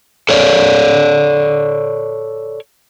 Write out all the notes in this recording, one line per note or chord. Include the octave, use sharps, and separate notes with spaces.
A4 C#5 D5